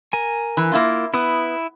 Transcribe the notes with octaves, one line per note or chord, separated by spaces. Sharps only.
A#4 G#5
E3
A#3 E4 F4
B3 E4 D#6